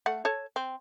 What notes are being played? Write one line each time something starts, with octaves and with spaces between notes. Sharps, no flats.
A3 F#5
A4 C#5 A5
C4